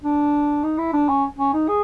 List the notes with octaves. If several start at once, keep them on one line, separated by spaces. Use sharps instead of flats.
D4
D#4
E4
D4
C#4
C#4
D#4
G#4